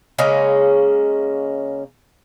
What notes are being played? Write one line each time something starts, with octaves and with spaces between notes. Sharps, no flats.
C#3 G#3 A#3 C#4